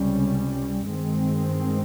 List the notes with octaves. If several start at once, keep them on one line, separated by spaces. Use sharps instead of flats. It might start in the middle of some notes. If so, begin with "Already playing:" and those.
Already playing: C#2 C3 G3 C#4
G2 D#3 G#3 C4